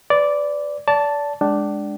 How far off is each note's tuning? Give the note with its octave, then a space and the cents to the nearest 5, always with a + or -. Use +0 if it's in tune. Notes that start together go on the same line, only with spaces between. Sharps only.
B4 +35 D5 -10
D5 -30 A5 +0
G#3 +0 D4 +0 G5 -40